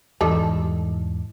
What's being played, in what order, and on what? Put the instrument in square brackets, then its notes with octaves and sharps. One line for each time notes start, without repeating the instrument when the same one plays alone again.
[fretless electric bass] E2 G#2 E3 [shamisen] D#3 G3 A4